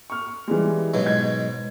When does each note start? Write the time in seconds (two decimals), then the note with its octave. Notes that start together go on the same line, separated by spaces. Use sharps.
0.10 C#6 F6
0.48 E3 G3 G#3
0.94 G#2 B2 F#3
1.06 G#6